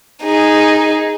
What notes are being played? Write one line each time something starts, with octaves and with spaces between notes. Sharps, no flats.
D#4 G#4